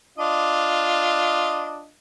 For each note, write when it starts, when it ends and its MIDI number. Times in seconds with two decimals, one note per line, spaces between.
0.18 1.88 62
0.18 1.88 65
0.18 1.88 75